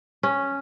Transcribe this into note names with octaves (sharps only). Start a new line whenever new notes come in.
C#4